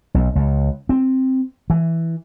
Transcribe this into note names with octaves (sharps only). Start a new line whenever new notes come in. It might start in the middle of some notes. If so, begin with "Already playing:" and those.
B1
C#2
C4
E3